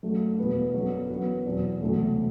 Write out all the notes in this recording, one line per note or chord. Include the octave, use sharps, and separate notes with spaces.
F#2 F#3 A3 D4 F#4
E2 B2 G3 B3 F#4
G1 F#2 D3 F#3 B3
F#2 E3 B3 F#4
E2 B2 F#3 C4
E1 D2 C3 F#3 A3